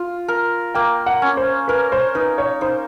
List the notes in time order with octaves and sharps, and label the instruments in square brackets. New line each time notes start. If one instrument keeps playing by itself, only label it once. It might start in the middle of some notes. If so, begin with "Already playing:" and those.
Already playing: [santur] F4
A#4
[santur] A#3 [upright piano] G5
[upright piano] F#5
[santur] C#4
[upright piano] C5
[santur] A#4 [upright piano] B4
[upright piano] C5
[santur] D#4 [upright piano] B4
[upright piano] C#5
[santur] D#4 [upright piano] C5